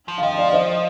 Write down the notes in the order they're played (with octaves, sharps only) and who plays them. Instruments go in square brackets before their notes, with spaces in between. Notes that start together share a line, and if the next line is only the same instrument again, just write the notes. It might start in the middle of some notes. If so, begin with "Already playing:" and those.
[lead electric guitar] F3
[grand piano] F5
[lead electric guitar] F3 [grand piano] D#5 G5
[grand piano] D5 F5
F5
C5 D#5